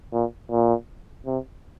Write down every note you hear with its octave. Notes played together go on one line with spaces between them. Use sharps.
A#2
A#2
C3